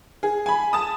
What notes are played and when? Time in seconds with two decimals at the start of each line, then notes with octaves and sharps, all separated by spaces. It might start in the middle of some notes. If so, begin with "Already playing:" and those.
0.23 G#4
0.46 G#5 B5
0.73 A5 D#6